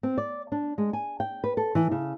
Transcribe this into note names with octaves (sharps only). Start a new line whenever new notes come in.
C4
D5
D4
G#3
G#5
G5
B4
A4
E3
C#3